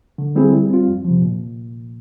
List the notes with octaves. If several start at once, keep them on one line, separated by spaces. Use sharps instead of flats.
D3
G3 C4 E4 G#4
G3
C4 F4
F2
C3 F3
A#2